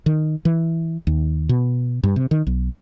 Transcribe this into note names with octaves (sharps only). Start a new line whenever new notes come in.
D#3
E3
D#2
B2
G2
C3
D#3
B1